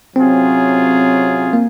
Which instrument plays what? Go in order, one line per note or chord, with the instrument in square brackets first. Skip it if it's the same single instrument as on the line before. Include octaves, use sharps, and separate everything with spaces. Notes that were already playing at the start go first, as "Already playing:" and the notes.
[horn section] C3 F#3 C#4 F4 G#4 [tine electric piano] C4
[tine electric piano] A#3